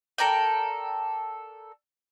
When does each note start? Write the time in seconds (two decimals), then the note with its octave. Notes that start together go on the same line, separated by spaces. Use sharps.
0.18 A4 A#4 D5 G5